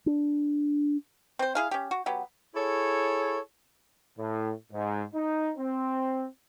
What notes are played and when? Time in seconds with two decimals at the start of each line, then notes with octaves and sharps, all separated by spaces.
0.06 D4
1.39 C4 C5
1.55 E4 G#4 F5
1.71 C#4 G4
1.91 F#4
2.06 F#3 B3 G4
2.54 E4 G#4 A4 C#5
4.18 A2
4.73 G#2
5.13 D#4
5.57 C4